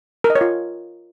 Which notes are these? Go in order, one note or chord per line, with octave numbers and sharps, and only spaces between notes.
A#4
D#5
C#5
F4